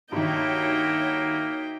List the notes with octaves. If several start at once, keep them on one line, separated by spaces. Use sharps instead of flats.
G2 D#3 A#3 D#4 F#4 C#5 E5 G5